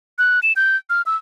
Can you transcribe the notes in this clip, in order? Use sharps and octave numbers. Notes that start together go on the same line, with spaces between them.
F#6
E7
G6
F6
E6